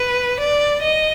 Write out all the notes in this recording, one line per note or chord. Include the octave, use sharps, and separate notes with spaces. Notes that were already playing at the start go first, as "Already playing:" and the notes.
Already playing: B4
D5
D#5